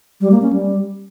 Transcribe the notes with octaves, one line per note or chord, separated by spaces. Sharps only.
G3
A#3
C#4
G3